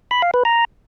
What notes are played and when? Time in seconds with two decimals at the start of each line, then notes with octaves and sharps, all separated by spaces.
0.11 B5
0.22 F5
0.34 B4
0.45 A#5